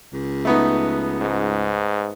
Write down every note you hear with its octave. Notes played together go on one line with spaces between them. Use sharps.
C#2
A3 B3 D#4
G#2